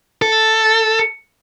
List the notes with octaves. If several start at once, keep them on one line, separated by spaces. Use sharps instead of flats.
A4